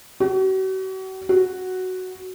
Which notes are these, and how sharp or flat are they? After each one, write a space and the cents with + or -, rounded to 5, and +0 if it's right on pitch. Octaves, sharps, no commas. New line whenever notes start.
F#4 +40
F#4 +0